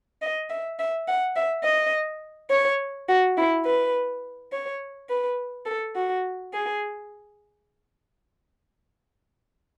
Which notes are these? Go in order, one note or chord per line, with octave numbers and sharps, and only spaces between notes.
D#5
E5
E5
F#5
E5
D#5
C#5
F#4
E4
B4
C#5
B4
A4
F#4
G#4